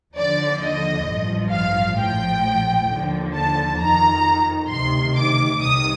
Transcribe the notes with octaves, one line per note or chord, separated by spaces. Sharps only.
D#2 D3 F3 D5
D#5
A1 G2 F3
F5
A#1 A2 F3 G5
D#2 D3 F3
A5
F2 D#3 A#5
D2 C3 D#3 C6
D6
C2 C3 D#3 D#6